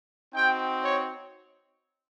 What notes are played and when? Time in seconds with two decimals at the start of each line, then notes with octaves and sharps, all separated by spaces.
0.33 C4 D#4 F#4 G5
0.82 C#5